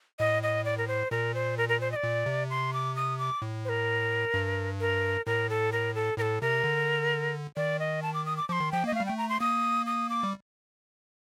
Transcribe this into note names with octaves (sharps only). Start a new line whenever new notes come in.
A2 D#5
D#5
D5
A#4
C5
A#2 A#4
C5
A#4
A#4
C5
D#5
D5
A#2
C3
C6
D6
D#6
D6
A2
C5
A#4
G2
A#4
A2 A#4
A4
A#4
A4
A2 A4 A#4
C3 A#4
D3
D#3 D5
D#5
A5
D6
D#6
D6
F3 C6 D6
D#3
F3 G5
A#3 D#5
A3 F5
G3
A3 G5
A#5
C6
A#3 D#6
D#6
D6
G3